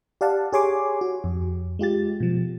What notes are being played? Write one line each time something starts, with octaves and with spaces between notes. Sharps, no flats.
G4 D5 F5 F#5 A5
G4 G#4 C#5 G#5 C6 D6
F#4
F2
G#3 F4 G4 A6
B2 F3